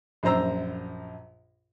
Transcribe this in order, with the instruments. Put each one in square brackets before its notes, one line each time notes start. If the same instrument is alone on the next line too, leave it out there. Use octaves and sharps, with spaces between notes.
[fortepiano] A#1 F#2 C5 A#5 E6